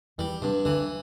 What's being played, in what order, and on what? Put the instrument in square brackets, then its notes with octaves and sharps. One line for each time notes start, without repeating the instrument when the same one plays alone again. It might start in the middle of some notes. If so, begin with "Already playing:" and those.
[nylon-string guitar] E2 E3 [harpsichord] G3
[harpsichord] G2 [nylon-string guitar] C3
[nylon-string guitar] D2 D3 [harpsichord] E3